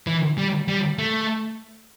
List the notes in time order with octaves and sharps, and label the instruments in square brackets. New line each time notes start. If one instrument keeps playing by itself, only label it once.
[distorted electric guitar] E3
G3
G3
A3